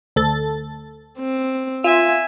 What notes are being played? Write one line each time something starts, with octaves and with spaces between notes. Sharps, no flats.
D2 A4 A6
C4
F4 E5 G#5